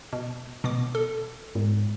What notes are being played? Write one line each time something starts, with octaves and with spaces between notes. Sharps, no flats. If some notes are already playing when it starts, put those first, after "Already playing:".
B2
B2 B3 D6
A4
G#2